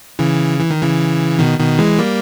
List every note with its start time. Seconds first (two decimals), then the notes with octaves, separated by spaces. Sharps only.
0.19 C#3 E3
0.60 E3
0.70 D#3
0.83 C#3 E3
1.39 B2 D#3
1.59 B2 D#3
1.79 E3 G#3
1.99 G3 A#3